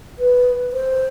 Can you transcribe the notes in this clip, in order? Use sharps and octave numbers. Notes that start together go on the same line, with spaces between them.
B4
C5